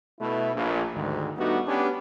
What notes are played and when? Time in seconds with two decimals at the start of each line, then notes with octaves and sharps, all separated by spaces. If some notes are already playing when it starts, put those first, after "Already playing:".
0.20 B2 A3 E4 B4
0.55 A#1
0.95 D2 G#2 D#3
1.38 G3 A3 B3 D4 D#4 F#4
1.67 B3 C#4 D4 G4